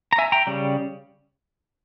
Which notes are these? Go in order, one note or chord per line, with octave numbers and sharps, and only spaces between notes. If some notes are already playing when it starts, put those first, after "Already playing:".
A#5
E5 G#5
G5 A#5
C#3 G3